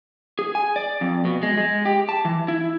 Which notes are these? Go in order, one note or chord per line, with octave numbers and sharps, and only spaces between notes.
G#4
G#5
D5
F2
B2
G#3
G#3
G4
A5
E3
E4